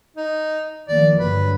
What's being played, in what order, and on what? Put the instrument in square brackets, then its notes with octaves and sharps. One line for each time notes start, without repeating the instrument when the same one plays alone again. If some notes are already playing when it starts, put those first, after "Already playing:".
[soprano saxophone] D#4
[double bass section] D#3 F3 A#3 [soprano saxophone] D5
[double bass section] G2 D3 F#3 [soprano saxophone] B4